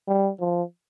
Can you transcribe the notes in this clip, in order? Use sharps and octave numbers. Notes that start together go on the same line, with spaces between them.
G3
F3